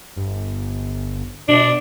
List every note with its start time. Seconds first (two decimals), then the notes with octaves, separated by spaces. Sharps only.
0.16 G1
1.48 B2 D4 D5